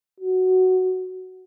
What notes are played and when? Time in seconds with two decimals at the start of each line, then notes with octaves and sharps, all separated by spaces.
0.20 F#4